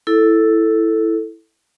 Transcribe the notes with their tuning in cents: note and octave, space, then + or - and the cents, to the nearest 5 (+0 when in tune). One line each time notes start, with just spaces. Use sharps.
E4 +0 A4 +0